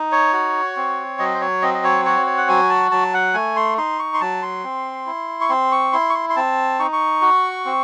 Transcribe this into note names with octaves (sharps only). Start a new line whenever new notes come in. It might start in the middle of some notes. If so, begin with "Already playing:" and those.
Already playing: D#4
C#5
F#4
C4
F#3 D#5
C5
C#5
C4 D#5
D#5
C#5
F#4 C#5
C#5
F#5
F#3 G#5
A5
F#3 A5
F#5
A3 G#5
C6
D#4 C6
C#6
C6
F#3 A5
C6
C4
E4
C#6
C4 C6
C#6
E4 C6
C#6
C6
C6
C4 A5
D#4 C#6
C#6
F#4
C4